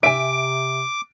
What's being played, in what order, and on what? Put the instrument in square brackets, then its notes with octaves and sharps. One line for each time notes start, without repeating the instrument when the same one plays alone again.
[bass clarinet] C3 [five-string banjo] E5 G#5 [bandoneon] D6 [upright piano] D7